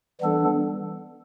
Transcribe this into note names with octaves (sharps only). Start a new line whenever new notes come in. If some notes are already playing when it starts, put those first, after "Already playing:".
E3 G3 B3 D4 A4